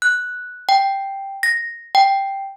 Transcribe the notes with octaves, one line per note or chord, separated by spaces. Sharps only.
F#6
G5
A#6
G5